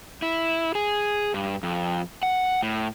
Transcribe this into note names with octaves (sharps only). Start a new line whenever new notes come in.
E4
G#4
G2
F2
F#5
A2